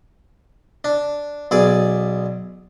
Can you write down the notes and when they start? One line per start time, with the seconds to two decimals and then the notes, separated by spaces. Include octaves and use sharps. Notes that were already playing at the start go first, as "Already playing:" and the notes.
0.84 D4
1.51 B1 G#4 D5